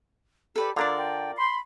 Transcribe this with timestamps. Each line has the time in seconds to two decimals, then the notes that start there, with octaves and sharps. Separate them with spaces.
0.56 G4 A4 B4 D5
0.76 D3 D4 F4 A#4 D5 A#5
0.97 G5
1.37 B5 C6